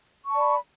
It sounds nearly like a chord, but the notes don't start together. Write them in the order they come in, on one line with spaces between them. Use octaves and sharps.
C#6 A5 D5 B5